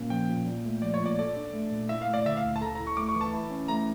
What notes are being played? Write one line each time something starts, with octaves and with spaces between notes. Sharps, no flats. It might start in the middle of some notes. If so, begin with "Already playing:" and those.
Already playing: A#2 A#3 C#4
F3 G5
A#2
A#2
A3
F3 D5
C#5
A#2
D5
A4 D5
D4
A3
A#2
E4 E5
F5
A3
D5
D3 E5
F5
D2
A5
A4 A#5
E4 A#5
C#6
A3 D6
C#6
E3
A5
E4
C#4
A3 A#5